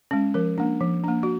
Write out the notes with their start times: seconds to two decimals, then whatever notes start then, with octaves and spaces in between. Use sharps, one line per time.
0.11 G#3 C#4
0.34 F3 A#4
0.58 A#3 D4
0.81 F3
1.04 A#3 D4
1.23 F#4